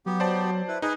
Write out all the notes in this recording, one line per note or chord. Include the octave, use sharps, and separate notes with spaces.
F#3 B3 G4
C5 D5 A5
E4 B4
D#4 G#4 B4